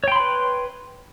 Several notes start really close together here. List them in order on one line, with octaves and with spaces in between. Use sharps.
C#5 G5 C6 B5 B4